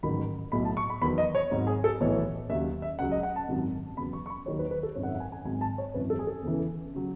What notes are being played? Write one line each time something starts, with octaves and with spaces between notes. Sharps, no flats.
A1 G#2 D#3 F#3 B5
B1 A2 F#3 B5
A5
C#6
B5
E2 D#3 F#3 B5
D#5
C#5
G#1 G#2 F#3
G#4
A4
B1 A2 E3 C#5
D#2 C#3 F#3 E5
E5
C#2 C#3 F#3 F#5
D#5
F#5
A5
G#1 F#2 D#3 F#3
E2 C#3 F#3 B5
C#6
C#6
B5
D#2 D#3 F#3 C#5
B4
B4
A4
G#1 F#2 D#3 C#5
F#5
E5
F#5
G#5
G#5
G#1 G#2 F#3 G#5
A5
C#5
G#1 F#2 E3 B4
A4
G#4
A4
E2 C#3 E3
C#3 F#3